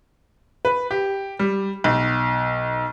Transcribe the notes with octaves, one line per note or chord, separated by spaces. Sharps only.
B4
G4
G3
B1